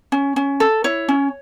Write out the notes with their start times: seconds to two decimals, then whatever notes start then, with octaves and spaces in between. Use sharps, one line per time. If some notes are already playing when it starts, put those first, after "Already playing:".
0.12 C#4
0.36 C#4
0.60 A4
0.84 E4 C#5
1.09 C#4